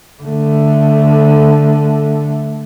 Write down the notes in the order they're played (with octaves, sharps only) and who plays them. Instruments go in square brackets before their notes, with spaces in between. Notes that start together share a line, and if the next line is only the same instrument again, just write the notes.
[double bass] D3 A3